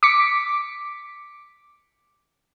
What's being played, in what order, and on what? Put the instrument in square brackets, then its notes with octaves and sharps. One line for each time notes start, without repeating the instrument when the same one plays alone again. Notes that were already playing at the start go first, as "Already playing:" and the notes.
[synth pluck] D6 B6 C#7